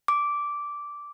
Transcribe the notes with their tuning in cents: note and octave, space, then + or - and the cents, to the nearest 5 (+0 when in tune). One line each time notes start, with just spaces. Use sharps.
D6 -10